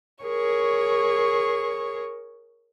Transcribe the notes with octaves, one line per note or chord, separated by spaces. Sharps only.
G#4 A#4 C#5 C#6